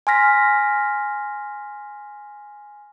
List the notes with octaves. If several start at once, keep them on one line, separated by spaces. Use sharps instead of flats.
G#5 C6 F6 A#6 B6